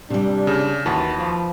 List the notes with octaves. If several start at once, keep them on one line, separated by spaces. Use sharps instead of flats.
C3 G3 D4
C#3
D#2 E3 F#4 B4 A5
F3